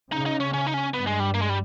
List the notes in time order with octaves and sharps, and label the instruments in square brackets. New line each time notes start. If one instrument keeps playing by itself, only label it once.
[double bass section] C#3 [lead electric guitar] D#4
[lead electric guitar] D#4
C#4
C#4
D#4
C#4
[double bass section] G2 [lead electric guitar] B3
[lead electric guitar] G#3
G3
A#3
G#3
G3